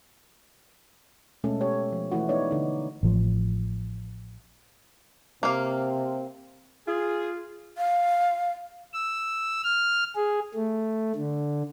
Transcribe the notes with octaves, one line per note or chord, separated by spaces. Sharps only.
B2 G#3 A3 C#4 A4
G4 C#5
F3
E3 A3 E4 F#4
B3 D#4 C#5 D5
D3 D#4
A1 F3
C3 A#3 C4 F5
F4 G#4
F5
E6
F6
G#4
A3
D3